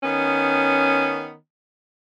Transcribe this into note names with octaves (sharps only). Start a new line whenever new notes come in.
D#3 B3 C#4